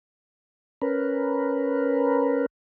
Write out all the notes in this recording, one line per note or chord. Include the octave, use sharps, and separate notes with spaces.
C#4 A#4 B4